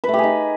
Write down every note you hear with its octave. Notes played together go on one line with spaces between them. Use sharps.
B4
A3
G4
G#4
D#4